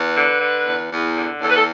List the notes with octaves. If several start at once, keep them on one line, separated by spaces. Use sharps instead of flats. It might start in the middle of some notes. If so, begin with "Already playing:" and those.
Already playing: E2 B4
D3
D3
E2
E2
D3
E2 A4
B4
A4